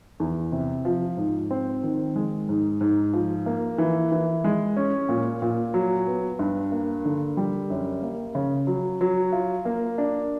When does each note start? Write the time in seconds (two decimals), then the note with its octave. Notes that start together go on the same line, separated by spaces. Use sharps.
0.20 E2
0.52 C3
0.85 F3
1.17 G#2
1.51 C4
1.83 D#3
2.16 G#3
2.49 G#2
2.81 G#2
3.13 F3
3.46 A#3
3.78 E3
4.12 E3
4.44 G#3
4.77 C#4
5.09 A#2
5.42 A#2
5.74 F#3
6.07 B3
6.39 G2
6.72 A#3
7.05 D3
7.37 G3
7.70 F#2
8.02 A#3
8.35 C#3
8.67 F#3
9.01 F#3
9.32 F4
9.65 A#3
9.98 D4